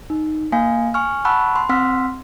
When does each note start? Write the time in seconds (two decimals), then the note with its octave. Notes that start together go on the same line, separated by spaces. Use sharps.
0.10 D#4
0.52 A#3 F5 G#5
0.94 G#5 C#6 F6
1.25 F#5 A5 B5 C#6 E6 F#6
1.56 C6
1.69 C4 F#5 C6 E6 F6 B6